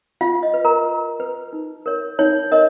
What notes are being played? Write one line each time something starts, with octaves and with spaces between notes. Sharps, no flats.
F4 F5
D#5
B4
A#4 A#5
F4
B4
D#4
A#4 C#5
D#4 C#5
A#4 C#5 D#5